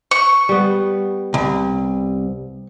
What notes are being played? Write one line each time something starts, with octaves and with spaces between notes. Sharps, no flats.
C#6
G3 B3
C2